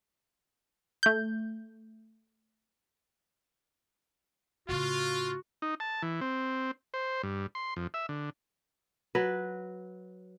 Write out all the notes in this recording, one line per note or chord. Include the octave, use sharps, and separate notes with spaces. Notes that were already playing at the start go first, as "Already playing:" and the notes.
A3 G6
A2 C#3 F4 F#4
D#4
A5
E3
C4
C5
G2
C6
F2
E5
D3
F#3 B4